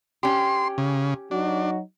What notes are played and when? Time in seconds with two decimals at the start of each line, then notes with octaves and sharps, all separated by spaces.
0.23 C#4 G4 C6
0.78 C#3
1.31 F#3 D4 D#4 F#4